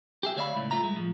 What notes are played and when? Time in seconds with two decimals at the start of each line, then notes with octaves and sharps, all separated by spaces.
0.23 G4 G#4 E5
0.36 D2 C#5 D5 E5 F5 B5
0.55 C#2 A2
0.71 A3 F4 E5 A#5
0.83 G2 G#3
0.96 A2 F3